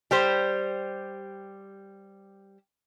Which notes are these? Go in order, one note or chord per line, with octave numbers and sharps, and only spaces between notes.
G3 G4 C5